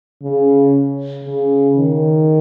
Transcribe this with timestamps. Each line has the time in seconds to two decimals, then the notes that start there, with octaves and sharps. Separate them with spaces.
0.23 C#3
1.25 C#3
1.77 D#3